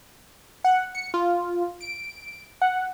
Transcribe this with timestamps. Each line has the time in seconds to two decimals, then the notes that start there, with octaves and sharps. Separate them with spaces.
0.64 F#5
0.95 C#7
1.14 F4
1.81 D7
2.62 F#5